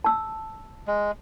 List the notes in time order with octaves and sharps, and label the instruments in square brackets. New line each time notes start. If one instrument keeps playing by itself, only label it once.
[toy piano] A5 E6
[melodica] G#3